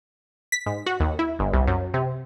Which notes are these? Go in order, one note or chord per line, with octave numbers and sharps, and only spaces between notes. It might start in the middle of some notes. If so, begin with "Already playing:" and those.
B6
G#2
F#4
D#2
E4
G1
C2
F#2
C3